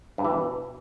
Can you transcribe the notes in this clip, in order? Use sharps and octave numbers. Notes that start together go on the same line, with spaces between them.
G2
E3
B2